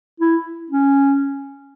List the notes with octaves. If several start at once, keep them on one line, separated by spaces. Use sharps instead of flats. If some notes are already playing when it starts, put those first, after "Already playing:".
E4
C#4